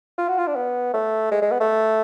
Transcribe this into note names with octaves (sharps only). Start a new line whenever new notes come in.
F4
F#4
F4
D4
B3
A3
G#3
G#3
B3
A3